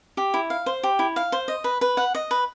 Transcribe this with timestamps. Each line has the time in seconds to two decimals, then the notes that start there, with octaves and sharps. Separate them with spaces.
0.17 G4
0.34 E4
0.50 F5
0.66 C5
0.83 G4
0.99 E4
1.16 F5
1.32 C5
1.48 D#5
1.64 B4
1.81 B4
1.97 F#5
2.15 D#5
2.31 B4